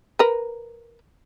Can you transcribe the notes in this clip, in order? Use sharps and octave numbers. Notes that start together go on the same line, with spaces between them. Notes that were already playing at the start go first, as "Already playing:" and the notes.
A#4 B4